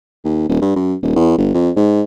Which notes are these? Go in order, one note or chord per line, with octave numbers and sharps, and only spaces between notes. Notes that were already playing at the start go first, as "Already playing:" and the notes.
D#2
D#1
G2
F#2
D#1
E2
G1
F2
G#2